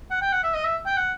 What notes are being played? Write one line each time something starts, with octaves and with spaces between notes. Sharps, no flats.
F#5
G5
F#5
E5
D#5
E5
G5
F#5